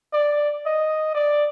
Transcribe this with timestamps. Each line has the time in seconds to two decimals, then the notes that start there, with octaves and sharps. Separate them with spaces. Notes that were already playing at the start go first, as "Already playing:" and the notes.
0.13 D5
0.66 D#5
1.14 D5